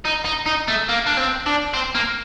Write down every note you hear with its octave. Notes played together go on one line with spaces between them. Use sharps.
D#4
D#4
D#4
A3
A#3
D4
C4
D4
C4
A#3